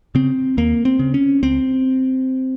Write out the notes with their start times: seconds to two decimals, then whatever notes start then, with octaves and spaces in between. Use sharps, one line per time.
0.15 C#3 C4
0.57 D#2 A#3
0.85 C4
0.99 C#3
1.14 C#4
1.43 C#2 C4